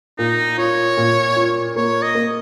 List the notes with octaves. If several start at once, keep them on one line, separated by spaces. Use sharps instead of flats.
A#2 D#4
F4 C#5
A#2
F4
A#3 C#5
D#5
A#3